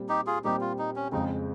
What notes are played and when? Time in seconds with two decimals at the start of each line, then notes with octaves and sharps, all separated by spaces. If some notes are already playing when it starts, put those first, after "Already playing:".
Already playing: A#2 G3 C4
0.09 D#4 G4
0.27 F4 G#4
0.44 A#2 G3 C4 D#4 G4
0.61 F4
0.79 D#4
0.96 C#4
1.12 F2 C#3 G#3 C4 D#4